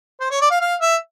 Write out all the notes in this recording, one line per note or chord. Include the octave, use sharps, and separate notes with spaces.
C5
C#5
D5
F5
F5
E5